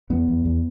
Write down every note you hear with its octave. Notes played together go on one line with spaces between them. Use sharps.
E2 B3
E2
E2